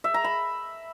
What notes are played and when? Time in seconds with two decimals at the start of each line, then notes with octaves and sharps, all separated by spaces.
0.04 E5
0.14 A#5
0.24 B5